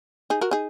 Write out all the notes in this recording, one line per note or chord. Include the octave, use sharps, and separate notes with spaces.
D#4 G#4
F#4 A#4
D#4 G#4